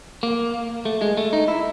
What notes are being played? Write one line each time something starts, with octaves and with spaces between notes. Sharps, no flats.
A#3
A3
G#3
A3
D#4
E4